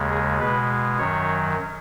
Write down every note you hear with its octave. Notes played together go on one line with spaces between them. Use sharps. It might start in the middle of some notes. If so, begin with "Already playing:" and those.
Already playing: D#2 C#3 G#3
G#4
B2 G#3 B4
F#2 D#3 F#3 C#5